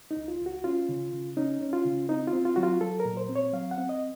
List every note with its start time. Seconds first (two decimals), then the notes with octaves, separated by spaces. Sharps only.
0.11 D#4
0.17 C#2
0.28 F4
0.41 C#2
0.46 F#4
0.64 C#4 F4
0.89 C#3
1.13 C#3
1.37 C#4 D#4
1.61 C#4
1.73 F4
1.85 C#3
2.09 C4 D#4
2.27 F4
2.33 C4
2.45 F4
2.56 F#3 F#4
2.63 F4
2.81 F#3 A4
3.00 A#4
3.05 A#2
3.17 C5
3.29 C4
3.36 C#5
3.53 F#3 F5
3.71 F#5
3.78 C4
3.89 D#5